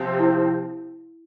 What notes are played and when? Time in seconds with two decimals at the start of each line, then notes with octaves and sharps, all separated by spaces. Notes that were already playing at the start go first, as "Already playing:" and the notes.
Already playing: C3 F3 C4
0.20 E4